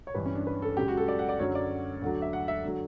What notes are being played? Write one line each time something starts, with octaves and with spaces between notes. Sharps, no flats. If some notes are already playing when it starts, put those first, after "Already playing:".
C#5
G2 E3 B4
C#4
D4
B4
A4
C#2 C#3 F#3 G4
F#4
A4
D5
F#5
D5
F#2 D3 F#3 C#5
D5
D2 D3 F#3
E5
F#5
E5
D3 F#3